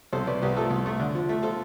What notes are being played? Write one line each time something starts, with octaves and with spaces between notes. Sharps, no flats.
C2 A4 C5
C2 B4 D5
C2 G4 B4
A3 F4 A4
C2
A3
D3
F3
A3
F3 F4 A4